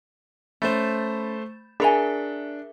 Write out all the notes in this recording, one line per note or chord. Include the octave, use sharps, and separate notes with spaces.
A3 C#4 C5 B5 A6 E7
D4 G#4 A#4 E5 G#5 A#5 B5